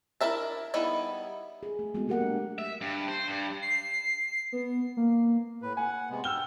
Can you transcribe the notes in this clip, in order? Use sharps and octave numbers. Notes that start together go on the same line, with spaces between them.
D4 E4 A#4 E5 A5
G3 B3 D#4 E4 G#4
G#4
A3
G#3 A3 B3 C4 F#4
F#3 G#3 A#3 G4 A#4 F#5
D4
E5
G2
C5
G2
C7
B3
A#3
A2 B4
F#5 G#5
C3 G#3 B3
G5 E6 F6 G7